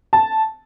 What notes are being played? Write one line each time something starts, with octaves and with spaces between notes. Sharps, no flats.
A5